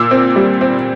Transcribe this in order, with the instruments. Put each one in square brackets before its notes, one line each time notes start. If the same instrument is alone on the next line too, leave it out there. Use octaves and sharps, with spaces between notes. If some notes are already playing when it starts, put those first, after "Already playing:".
Already playing: [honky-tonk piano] A#2 D6 E6
C4
G3
C4